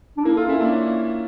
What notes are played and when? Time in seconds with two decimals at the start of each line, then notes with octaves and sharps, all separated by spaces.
0.17 D4
0.24 A#3 E4
0.36 F4 A4
0.48 C#4 E4
0.61 A#3 D4
0.72 C#4